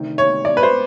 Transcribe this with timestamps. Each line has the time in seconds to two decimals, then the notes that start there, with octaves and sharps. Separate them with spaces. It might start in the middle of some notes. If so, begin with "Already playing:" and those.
Already playing: D2 C3 D#3
0.18 C#5
0.45 D5
0.57 B4
0.63 C5